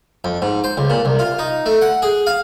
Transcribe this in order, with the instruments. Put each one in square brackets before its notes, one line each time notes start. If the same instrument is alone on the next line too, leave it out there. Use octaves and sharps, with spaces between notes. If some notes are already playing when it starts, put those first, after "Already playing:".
[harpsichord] F2
G#2
C5
C#2
A#2
C2
F4
D#4
A3
F#5
G#4
F5